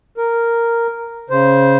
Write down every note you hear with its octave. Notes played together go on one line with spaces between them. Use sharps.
A#4
C#3 C5